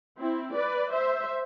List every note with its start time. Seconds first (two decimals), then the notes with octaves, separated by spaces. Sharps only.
0.18 C4 E4
0.55 B4 D5
0.92 C5 E5